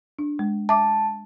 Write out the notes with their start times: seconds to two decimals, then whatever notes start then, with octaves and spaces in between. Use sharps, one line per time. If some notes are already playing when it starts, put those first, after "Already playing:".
0.19 D4
0.39 G#3
0.69 E5 A5 D6